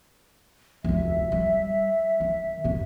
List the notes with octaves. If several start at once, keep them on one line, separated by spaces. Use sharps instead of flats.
F1 D2 E5
G3
D#3
F1 G#2